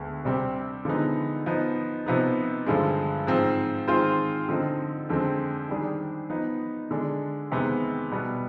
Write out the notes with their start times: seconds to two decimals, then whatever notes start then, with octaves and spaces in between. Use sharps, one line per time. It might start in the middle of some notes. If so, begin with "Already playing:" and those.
Already playing: D2 D3 G#3 B3
0.25 C3 G3 C4 G4
0.85 D3 F3 G#3 B3 D#4
1.46 F3 B3 D#4
2.06 C3 F3 B3 D#4
2.66 G2 D3 F3 G#3
3.27 G#2 F3 C4
3.88 D#3 G#3 C4 F4 C5
4.49 D3 F3 C4 D#4
5.09 F2 D3 G#3 C4
5.69 D#3 G3 D4 G#4
6.30 F3 B3 D#4
6.91 D3 G#3 D4
7.51 F2 C3 D#3 G#3 B3
8.11 B2 G3 B3